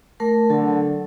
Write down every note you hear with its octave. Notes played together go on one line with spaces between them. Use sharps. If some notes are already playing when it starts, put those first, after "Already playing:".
A3 A#4 A5
D3 F#3 A4